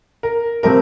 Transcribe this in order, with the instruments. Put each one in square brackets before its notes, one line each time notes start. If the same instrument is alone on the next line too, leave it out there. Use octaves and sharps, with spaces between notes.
[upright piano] A#4
[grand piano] F3 A3 C4 G4 [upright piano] A#4